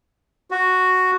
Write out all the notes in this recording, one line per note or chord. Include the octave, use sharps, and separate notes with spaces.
F#4